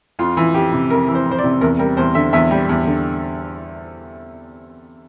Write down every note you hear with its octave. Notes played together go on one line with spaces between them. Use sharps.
F2 F4
E3
F2 G4
C3
F2 A#4
E3
C5
F2
C5
D5
C3
E2 A#4
G3 A#4
E2 C5
D3 E5
E2 E5
G3
E2
D3